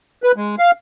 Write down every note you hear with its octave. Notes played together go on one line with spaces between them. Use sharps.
B4
G#3
F5